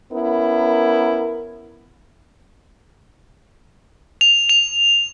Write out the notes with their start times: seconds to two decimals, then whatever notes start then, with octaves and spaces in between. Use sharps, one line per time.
0.12 B3 C#4 E4 A#4
4.21 F7
4.49 F7